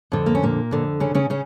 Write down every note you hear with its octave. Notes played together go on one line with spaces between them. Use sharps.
F2 D3
A#3
C#4
A#2 A#3
F2 D3
C#3 C#4
C#3 C#4
C#3 C#4